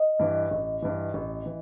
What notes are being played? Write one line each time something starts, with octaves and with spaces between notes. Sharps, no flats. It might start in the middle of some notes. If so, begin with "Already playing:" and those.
Already playing: D#5
G2 E3
A1
G2 E3
A1
E3